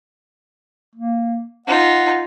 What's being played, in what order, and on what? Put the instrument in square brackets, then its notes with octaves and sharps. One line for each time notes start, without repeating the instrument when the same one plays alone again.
[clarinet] A#3
[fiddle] D#4 F4 [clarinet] F#5